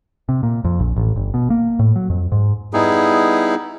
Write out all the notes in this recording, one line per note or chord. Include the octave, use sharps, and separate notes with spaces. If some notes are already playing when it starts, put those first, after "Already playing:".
C3
A#2
F2
A#1
A1
G1
B2
A#3
A2
F#3
F2
G#2
G3 B3 D#4 E4 G#4